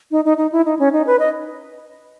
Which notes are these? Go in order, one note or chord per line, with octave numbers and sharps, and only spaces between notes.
D#4
D#4
D#4
E4
D#4
C#4
D#4
B4
D#5